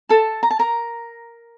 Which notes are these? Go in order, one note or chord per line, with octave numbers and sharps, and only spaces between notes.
A4 A5
A#5
A5
A#4 A#5